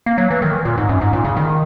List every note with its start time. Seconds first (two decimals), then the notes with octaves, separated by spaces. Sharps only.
0.06 A#3
0.18 F#3
0.30 E3
0.42 D#3
0.65 A#2
0.78 G#2
0.89 F#2
1.01 G#2
1.13 A#2
1.25 C#3
1.37 D#3